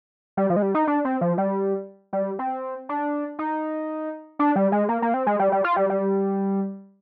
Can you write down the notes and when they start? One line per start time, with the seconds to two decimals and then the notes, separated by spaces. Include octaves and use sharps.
0.37 G3
0.50 F3
0.56 G#3
0.62 G3
0.75 D#4
0.87 D4
1.05 C4
1.21 F3
1.38 G3
2.13 G3
2.39 C4
2.89 D4
3.39 D#4
4.39 D4
4.56 G3
4.72 G#3
4.89 A#3
5.02 A#3
5.14 C4
5.27 G#3
5.39 G3
5.52 G3
5.64 F4
5.77 G3
5.90 G3